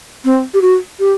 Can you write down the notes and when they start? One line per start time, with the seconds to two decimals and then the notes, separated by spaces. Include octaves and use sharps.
0.25 C4
0.54 G4
0.62 F#4
1.00 G4